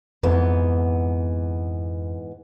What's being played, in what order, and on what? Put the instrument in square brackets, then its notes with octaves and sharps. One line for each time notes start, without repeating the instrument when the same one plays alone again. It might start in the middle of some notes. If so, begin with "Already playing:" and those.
[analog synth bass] F2 [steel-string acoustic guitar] G#2 E3 B3